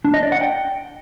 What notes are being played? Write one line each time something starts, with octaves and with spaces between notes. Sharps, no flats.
D4
D#5
D5
F#5
G5